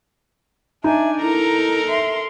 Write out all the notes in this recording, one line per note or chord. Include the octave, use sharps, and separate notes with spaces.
D4 D#4 E5 G#5
E4 A4 A#4 A#5
E5 C6